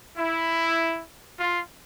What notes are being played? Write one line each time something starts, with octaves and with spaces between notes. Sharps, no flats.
E4
F4